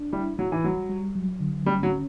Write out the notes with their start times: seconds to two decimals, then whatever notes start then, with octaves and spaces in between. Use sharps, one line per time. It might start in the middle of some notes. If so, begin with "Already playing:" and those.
Already playing: D4
0.13 G3 E4
0.38 F#3 E4
0.52 E3
0.64 F#3 G3
0.89 G3
1.15 F#3
1.40 D3
1.66 G3 C#4
1.83 F#3
1.92 C#4